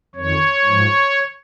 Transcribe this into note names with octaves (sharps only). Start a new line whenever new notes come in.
F2 D#3 C#5
G#2 F3